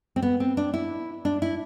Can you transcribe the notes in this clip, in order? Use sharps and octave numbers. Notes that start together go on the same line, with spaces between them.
C4
B3
C4
D4
E4
D4
E4